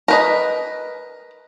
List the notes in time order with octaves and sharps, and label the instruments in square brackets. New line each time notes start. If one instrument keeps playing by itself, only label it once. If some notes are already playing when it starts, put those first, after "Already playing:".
[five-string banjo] A#4 B4 D#5